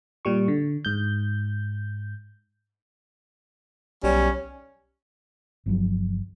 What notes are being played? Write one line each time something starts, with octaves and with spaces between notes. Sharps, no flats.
A#2 G3 C#6
D3
G#2 G6
B1 G3 C#4
G1 F3 F#3